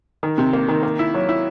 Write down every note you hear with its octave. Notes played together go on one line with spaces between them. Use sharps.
D#3
C3
A#3
D#3
A#3
E4
F#3
E4